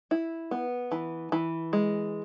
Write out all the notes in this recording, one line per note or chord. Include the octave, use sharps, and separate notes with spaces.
E4
B3
E3
E3
G#3